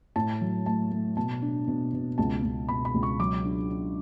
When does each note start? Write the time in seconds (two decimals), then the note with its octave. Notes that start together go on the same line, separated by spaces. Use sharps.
0.16 A2 A5
0.41 F#3
0.66 A3 A5
0.91 A3
1.17 B2 A5
1.42 D4
1.67 B2
1.93 B2
2.18 C#2 A5
2.43 C#2
2.69 B2 B5
2.85 B5
2.94 C#2
3.03 C#6
3.20 F#3 D6
3.45 D4
3.70 D4